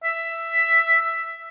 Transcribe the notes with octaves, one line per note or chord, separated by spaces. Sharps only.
E5